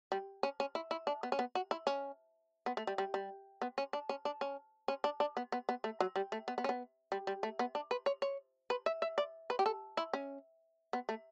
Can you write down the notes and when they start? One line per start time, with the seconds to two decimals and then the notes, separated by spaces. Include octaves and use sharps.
0.12 G3
0.43 C#4
0.60 C#4
0.75 E4
0.91 E4
1.07 D4
1.23 B3
1.32 C#4
1.39 B3
1.55 F#4
1.71 E4
1.87 C#4
2.66 B3
2.77 A3
2.87 G3
2.98 G3
3.14 G3
3.62 B3
3.78 C#4
3.93 D4
4.09 C#4
4.25 D4
4.41 C#4
4.88 C#4
5.04 D4
5.20 D4
5.37 B3
5.52 B3
5.69 B3
5.84 A3
6.00 F#3
6.16 G3
6.32 A3
6.48 B3
6.58 B3
6.64 C#4
6.69 B3
7.12 G3
7.27 G3
7.43 A3
7.59 B3
7.75 D4
7.91 B4
8.06 C#5
8.22 C#5
8.70 B4
8.86 E5
9.02 E5
9.18 D5
9.50 B4
9.59 G4
9.66 A4
9.97 E4
10.13 C#4
10.93 B3
11.09 A3